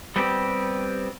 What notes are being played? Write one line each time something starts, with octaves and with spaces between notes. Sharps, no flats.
G3 B3 C4 G4